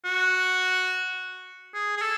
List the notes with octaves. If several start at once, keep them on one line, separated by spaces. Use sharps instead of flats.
F#4
G#4
G#4
A4